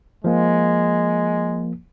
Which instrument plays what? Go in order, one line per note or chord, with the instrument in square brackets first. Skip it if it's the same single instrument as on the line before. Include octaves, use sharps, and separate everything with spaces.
[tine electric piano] F3 A#3 [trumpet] G#3